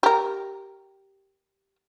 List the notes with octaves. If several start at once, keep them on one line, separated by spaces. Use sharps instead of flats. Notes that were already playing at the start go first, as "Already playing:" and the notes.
G4 A#4